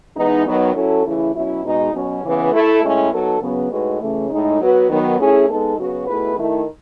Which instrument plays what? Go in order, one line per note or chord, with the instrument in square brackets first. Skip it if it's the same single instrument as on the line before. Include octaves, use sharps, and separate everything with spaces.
[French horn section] E3 G#3 B3 D#4
D#3 F#3 B3
F#3 C#4 E4 A4
C#3 E3 A3 E4
B2 F#3 C#4 E4
B2 G#3 D#4
B2 F#3 C#4
C#3 E3 B3
A3 E4 A4
A2 G#3 C#4 E4
F#3 B3 D#4 A4
C#3 F#3 B3
A2 G#3 D#4 F#4 B4
C#3 E3 A3
A2 G#3 D#4
F#3 B3 F#4 B4
D#3 F#3 B3
A3 C#4 E4 G#4
G#3 B3 D#4 A4
C#3 F#3 B3 F#4
B2 A3 E4 G#4 B4
D#3 A3 E4